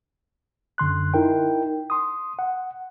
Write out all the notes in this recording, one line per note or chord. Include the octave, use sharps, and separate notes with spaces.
F#2 D3 C6 F#6
D#4 E4 A#4 G5
C6 D#6
F#5